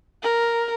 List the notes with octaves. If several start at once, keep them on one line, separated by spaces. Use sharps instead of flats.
A#4